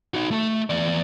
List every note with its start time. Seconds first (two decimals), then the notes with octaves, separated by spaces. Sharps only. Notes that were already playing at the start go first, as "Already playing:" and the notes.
0.14 D#4 F#4
0.31 A3 E5
0.70 E2 D5